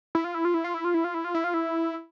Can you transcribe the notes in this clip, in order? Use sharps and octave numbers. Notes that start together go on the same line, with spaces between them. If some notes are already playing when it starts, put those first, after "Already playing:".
E4
F4
E4
F4
E4
F4
E4
F4
E4
F4
E4
F4
E4
F4
E4